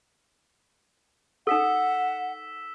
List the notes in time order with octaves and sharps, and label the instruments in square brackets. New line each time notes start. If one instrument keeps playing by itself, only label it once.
[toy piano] D#4 A4 [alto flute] F#5 [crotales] E6 B6 E7